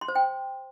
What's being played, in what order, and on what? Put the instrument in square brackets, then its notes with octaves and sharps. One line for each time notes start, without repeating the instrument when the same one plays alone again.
[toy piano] C6
C5
G5